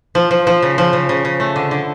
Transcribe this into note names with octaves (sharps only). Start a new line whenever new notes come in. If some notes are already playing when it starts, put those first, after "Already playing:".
F3
F3
F3
C#3
F3
C#3
C#3
C#3
A3
D3
D3